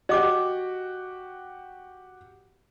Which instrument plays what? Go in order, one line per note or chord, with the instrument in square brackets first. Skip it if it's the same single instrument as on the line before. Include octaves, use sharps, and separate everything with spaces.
[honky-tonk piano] F#4 G4 [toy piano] D#5 D6